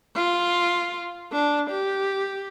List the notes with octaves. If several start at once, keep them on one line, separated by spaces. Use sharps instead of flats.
F4
D4
G4